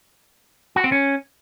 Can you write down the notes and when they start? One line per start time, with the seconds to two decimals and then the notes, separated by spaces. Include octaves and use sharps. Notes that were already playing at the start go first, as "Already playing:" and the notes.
0.76 F#4
0.84 C4
0.92 C#4